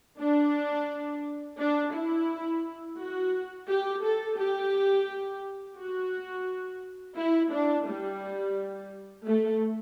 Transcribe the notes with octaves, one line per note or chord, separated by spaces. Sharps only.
D4
D4
E4
F#4
G4
A4
G4
F#4
E4
D4
G3
A3